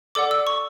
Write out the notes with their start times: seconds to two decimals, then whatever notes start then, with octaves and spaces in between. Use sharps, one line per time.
0.15 A4 D5 F#5 D6
0.31 E6
0.47 C#6